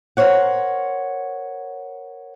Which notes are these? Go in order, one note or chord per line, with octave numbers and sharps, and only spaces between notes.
A#4 C5 C#5 F#5